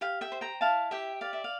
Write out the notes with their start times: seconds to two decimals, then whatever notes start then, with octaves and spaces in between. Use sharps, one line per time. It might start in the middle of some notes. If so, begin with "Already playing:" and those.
0.01 G4 F5
0.21 E5 G5
0.32 C5
0.41 G5 A#5
0.61 E4 F5 A5
0.91 G4 E5 G5
1.21 D5 F5
1.33 E5
1.44 F5